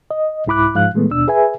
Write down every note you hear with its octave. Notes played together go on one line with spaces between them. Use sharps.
D#5
C2 G#2 E4 B5 D6 F#6
G#2 F3 F5 F#6
A#2 E3 G#3 A3 B3
D#2 B2 D4 E6
G#4 B4 E5 G#5